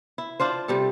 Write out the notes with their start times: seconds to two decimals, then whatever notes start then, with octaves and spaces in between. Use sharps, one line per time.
0.18 E4
0.40 D4 F4 C5
0.68 C3 G3 A4